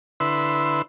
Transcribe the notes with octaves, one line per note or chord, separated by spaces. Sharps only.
D3 E4 B4 C6 E6